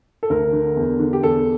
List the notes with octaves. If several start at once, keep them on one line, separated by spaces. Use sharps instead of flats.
A4
D2 A#4
D3
E2
D3
G4
E2 A4